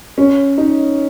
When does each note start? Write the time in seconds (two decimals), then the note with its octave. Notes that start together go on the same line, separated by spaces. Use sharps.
0.18 C#4
0.58 D#4